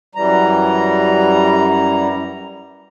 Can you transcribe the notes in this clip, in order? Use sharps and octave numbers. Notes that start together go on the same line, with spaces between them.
F#2 E3 G3 A#5